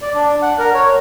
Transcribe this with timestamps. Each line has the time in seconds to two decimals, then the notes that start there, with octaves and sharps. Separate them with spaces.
0.02 D5
0.15 D4
0.42 F#5
0.59 A#4
0.74 C#5